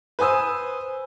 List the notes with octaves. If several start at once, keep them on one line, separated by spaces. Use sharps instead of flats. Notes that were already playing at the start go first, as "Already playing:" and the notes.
B4 C5 G#5 D#6 E6